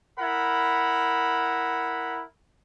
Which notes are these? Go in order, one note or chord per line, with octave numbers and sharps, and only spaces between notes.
E4 A#4 F#5 B5